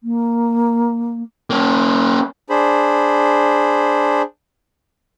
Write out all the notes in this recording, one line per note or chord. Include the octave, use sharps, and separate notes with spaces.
A#3
A#3 C#4
D4 G#4 C5 B5